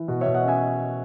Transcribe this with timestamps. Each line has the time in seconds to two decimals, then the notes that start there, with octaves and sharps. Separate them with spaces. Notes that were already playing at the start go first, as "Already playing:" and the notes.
Already playing: E3
0.08 B2 F#4
0.21 B2 C#5 E5
0.34 D#5 F#5
0.44 C#4 E5 G#5